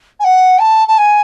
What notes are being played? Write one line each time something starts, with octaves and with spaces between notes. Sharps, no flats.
G#5
F#5
A5
A5
G#5